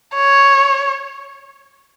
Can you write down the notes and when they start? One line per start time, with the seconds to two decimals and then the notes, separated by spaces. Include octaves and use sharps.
0.15 C#5